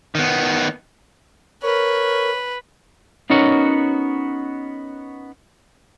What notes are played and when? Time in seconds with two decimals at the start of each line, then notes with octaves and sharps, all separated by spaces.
0.15 D#3 B3
1.63 A#4 B4 C#5
3.30 B3 C#4 D#4 F#4 A#4 C#5